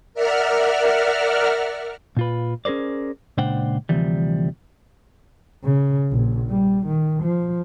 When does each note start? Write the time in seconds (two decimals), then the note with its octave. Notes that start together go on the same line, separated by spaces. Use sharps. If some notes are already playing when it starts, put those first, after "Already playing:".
0.14 A#4 D5 E5 F#5 F6
2.17 A#2 F4 B4
2.65 C#4 G#4 A#4 C5 D5
3.38 C#2 A#2 D4 C5 F#5 G5
3.89 D2 C3 E3 F3 G3
5.64 C#3
6.10 A#1
6.50 G3
6.86 D#3
7.23 F3